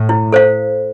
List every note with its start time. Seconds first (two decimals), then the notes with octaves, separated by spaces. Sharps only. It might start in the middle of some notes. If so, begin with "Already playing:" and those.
Already playing: A2
0.09 E4
0.32 A4 C5 F5